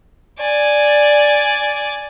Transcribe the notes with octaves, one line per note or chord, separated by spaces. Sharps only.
D5 G#5